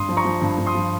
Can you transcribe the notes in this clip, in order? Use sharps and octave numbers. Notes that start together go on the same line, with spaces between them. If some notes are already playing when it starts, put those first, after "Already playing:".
Already playing: G2 C6 D#6
F3
A#5 C#6
F3
G2
G2
C6 D#6
F3